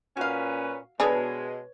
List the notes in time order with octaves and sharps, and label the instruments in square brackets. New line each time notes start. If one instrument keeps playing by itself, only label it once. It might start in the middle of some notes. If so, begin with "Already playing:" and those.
[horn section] A#2 C#4 B4 [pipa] F#4 F5
[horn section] B2 G#3 [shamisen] D4 G#4 A4 [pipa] B4 C#5